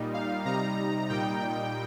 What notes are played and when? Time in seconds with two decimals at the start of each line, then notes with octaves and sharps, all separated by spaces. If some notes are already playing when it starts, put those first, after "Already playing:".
Already playing: A#2 G3 D#4
0.14 F5
0.45 C3 G3 D#4 A#5
1.10 A#2 G3 D#4 G5